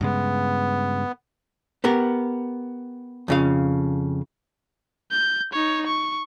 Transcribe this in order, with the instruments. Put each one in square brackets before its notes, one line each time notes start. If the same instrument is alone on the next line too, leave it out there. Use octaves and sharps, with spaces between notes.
[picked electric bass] G2 C#3 G#3 [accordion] B3
[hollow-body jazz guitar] B3 G4 A#4
F2 C#3 F5
[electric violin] G6
D#4 C#5
C#6